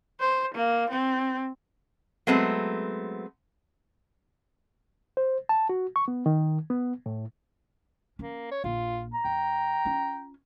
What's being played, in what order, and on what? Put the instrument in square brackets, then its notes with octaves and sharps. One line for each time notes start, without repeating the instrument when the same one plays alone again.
[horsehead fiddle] C5
A#3
C4
[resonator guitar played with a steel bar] F#3 G#3 A3 B3 C4
[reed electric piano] C5
A5
F#4
C#6
B3
D#3
B3
A2
[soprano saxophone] A#3 [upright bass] C#4
[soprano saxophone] C#5
[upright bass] A#1 [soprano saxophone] F4
[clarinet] A#5
[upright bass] F2 [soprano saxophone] G5
[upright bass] C#4 F4